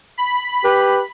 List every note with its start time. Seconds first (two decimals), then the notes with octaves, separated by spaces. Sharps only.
0.18 B5
0.64 G4 B4